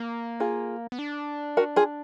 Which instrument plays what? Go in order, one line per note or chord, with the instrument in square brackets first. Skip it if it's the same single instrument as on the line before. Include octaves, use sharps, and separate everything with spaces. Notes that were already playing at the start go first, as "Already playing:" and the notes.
Already playing: [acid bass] A#3
[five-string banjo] F4 G#4
[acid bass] B3
D4
[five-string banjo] F#4 A#4
F4 G#4